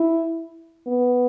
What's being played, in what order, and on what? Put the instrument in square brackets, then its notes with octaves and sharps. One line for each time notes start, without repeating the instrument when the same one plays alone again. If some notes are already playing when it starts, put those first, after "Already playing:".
Already playing: [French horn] E4
B3